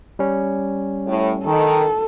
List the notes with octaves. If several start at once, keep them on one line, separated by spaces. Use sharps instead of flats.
G3 C#4
A2
D#3 A4